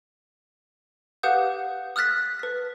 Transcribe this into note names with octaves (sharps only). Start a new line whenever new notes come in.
G4 B4 F5 F#5 D#6 G6
D#6 F6 F#6 A6 B6
B4 B6